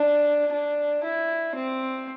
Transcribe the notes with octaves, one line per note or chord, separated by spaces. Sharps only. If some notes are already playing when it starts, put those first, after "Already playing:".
Already playing: D4
D4
E4
C4